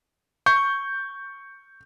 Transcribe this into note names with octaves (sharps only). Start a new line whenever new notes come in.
C#6 G6